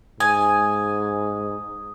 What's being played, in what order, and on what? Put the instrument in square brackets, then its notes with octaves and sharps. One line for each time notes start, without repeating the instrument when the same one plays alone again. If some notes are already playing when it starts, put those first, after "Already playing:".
[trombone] G#2 [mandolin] G#5 [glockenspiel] D#6